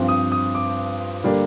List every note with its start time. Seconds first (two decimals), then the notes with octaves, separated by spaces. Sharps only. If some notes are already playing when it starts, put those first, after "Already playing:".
Already playing: G2 F3 C4
0.08 D#6
0.32 D#6
0.55 D6
1.24 D3 G3 A#3 D4